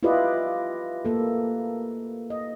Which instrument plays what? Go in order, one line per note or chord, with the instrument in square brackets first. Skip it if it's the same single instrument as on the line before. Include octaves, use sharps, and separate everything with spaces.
[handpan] E4 F4 G4 B4 D5 D#5
A#3 A4
D#5